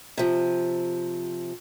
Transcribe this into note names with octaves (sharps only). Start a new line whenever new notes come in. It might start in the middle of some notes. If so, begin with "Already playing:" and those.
C3 F3